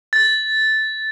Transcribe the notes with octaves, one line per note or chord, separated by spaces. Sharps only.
A6